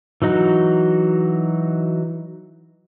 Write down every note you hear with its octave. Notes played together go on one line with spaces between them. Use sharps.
E3 F#3 D#4 F#4